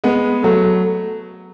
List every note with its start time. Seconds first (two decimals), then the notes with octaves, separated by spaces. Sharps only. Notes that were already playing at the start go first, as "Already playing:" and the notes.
0.04 G#3 B3
0.43 F#3 A3